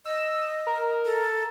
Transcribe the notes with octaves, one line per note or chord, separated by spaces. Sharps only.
D#5 E6
A#4
A4